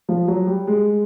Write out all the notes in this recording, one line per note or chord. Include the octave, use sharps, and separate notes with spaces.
F3
F#3
G3
G#3